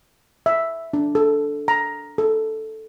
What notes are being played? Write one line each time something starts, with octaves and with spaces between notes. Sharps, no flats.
E5
D4
A4
A#5
A4